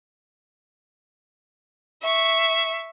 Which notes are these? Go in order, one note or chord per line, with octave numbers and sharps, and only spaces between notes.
E5 C#6